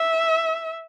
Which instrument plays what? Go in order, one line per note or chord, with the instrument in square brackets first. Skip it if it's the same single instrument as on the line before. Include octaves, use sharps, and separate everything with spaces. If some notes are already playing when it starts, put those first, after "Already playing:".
Already playing: [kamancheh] E5